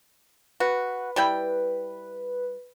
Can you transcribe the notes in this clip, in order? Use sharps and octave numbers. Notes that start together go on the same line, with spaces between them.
F#4 B4
G3 E4 G5